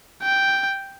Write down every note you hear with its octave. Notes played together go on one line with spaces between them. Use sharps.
G5